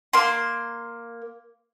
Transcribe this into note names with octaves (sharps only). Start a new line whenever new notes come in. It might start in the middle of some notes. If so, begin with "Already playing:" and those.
A#3 C6